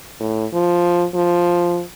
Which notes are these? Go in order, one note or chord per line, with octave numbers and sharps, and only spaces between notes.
A2
F3
F3